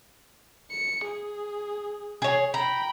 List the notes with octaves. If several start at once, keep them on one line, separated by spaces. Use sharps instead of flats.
C#7
G#4
G#4 C#5
G5 A#5 B5